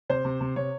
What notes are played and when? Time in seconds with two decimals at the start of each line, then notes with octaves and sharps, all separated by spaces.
0.10 C3 C5
0.25 C3
0.41 C3
0.56 C3 C#5